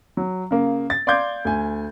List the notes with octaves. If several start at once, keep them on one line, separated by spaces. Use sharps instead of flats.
F#3
C#3 A#3
A6
D5 F5 C6 D6 G6 G#6
D2 G#5